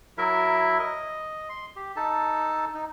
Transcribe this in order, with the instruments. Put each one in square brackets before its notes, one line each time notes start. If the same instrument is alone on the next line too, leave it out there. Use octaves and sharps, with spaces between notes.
[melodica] F#3 E4 A#4 E5
D#5
C6
G4
D#4 A4 A5
D#4